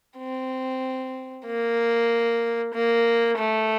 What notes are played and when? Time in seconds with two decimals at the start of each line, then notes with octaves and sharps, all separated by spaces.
0.18 C4
1.46 A#3
2.74 A#3
3.38 A3